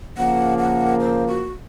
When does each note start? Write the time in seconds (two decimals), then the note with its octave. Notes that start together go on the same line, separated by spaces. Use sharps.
0.17 C#3 F3 A#3 F#5
0.58 F#5
1.00 C5
1.27 F#4